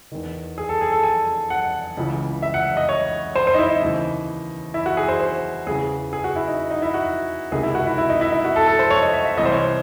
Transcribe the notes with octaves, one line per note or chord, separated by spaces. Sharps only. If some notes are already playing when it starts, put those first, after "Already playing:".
E2 D#3
G#4
A4
G#4
A4
G#5
F#5
C#2 C#3 E3
E5
F#5
D#5
C#5
C5
C5
D#4
E4
D#4
D#2 C#3 E3
E4
F#4
G#4
C5
C5
E2 C#3 E3 G#4
G#4
F#4
E4
D#4
D#4
E4
F#4
C#2 C3 D#3 G#4
E4
F#4
E4
E4
D#4
E4
E4
F#4
A4
A4
C5
C#5
D#5
E5
E5
C2 C3 E3 D#5
C5
C#5